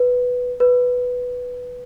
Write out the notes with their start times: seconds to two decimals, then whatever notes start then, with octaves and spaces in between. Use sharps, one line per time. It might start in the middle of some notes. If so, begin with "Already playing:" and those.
Already playing: B4
0.60 B4